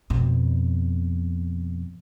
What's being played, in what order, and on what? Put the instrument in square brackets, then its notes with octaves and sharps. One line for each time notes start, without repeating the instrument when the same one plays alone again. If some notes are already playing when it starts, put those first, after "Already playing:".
[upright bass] F2 B2